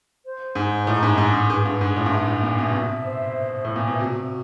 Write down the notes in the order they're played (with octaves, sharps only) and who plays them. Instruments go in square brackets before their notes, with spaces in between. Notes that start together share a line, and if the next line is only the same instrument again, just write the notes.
[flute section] C5
[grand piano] G#2 [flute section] D#4
[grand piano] A2 [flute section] G#4
[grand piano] G#2
[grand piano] G#2 [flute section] G#4
[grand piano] G#2
[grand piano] G#2 [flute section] B4
[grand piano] G2
[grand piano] G#2 [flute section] G#4
[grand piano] A2
G2
[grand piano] G#2 [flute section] E5
[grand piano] A2
[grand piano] A#2 [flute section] E5
[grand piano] B2
[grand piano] C3 [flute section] E5
[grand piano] B2
[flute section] C5
E5
[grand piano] A2 [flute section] C5
[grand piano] A#2
B2
[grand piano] C3 [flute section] F#4